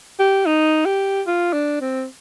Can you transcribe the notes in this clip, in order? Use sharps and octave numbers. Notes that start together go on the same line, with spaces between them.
G4
D#4
G4
F4
D4
C4